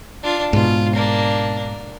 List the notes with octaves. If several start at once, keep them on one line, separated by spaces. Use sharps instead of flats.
D4 F4
G#2 B2 F4
A#3 D4